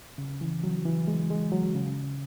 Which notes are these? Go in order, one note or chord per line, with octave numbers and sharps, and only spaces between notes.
C#3
E3
F#3
E3
G#3
G#3
F#3
C#3